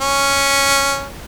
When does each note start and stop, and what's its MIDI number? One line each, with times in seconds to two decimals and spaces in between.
0.01 1.08 61